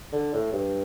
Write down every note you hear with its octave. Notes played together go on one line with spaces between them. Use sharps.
D3
A2
G2